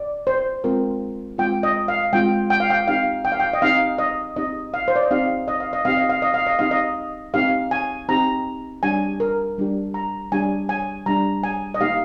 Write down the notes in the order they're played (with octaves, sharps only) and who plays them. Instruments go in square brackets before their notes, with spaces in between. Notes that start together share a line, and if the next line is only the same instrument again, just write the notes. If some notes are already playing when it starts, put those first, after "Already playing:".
Already playing: [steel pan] D5
C5
G#3 C4 F4 A#4
G#3 C4 F4 G5
D#5
F5
G#3 C4 F4 G5
G5
F5
G5
C4 D#4 G4 F5
G5
F5
G5
D#5
C4 D#4 G4 F5
D#5
C4 D#4 G4 D#5
F5
C5
D5
D#5
C4 D#4 G4 F5
D#5
F5
D#5
C4 D#4 G4 F5
D#5
F5
D#5
F5
D#5
C4 D#4 G4 F5
D#5
C4 D#4 G4 F5
G#5
C4 D#4 G4 A#5
G3 D4 G4 G#5
A#4
G3 D4 G4
A#5
G3 D4 G4 G#5
G#5
G3 D4 G4 A#5
G#5
D#5
A#3 D#4 G4 F5